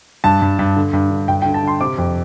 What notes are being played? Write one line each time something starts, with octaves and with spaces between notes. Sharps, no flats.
G2 A5
G2
G2
D3
G2
D3
G2 G5
G5
D3
A5
D3 C6
C3 D6
F2